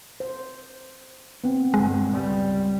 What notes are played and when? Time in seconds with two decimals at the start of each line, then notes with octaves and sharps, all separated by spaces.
0.20 C5
1.44 B3 C4
1.74 G1 G#3
2.12 C#2 G3